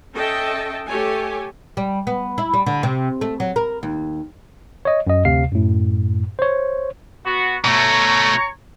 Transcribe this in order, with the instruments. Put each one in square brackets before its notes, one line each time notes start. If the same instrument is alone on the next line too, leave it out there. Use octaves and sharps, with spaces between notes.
[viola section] C#4 A4 D#5 E5 G5 A5
A3 G4 A4 C#5 G#5
[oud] G3
B3
E4
G3
D3
C3
A3
F#3
A#4
D#2
[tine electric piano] C#5 D#5
F#2 D#5
D2 C3 F5 C7
F#2 A2
C5 C#5
[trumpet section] B3 F#4
[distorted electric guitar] B2 A3 [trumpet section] C#5 A#5 C#6